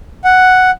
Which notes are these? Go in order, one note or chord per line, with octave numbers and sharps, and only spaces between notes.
F#5